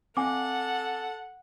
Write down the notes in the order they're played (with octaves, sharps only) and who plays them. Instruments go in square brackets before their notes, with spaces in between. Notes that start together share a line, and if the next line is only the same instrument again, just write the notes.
[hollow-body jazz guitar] C4 D#5 F5 [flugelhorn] A4 [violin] F#5 [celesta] G#5 D6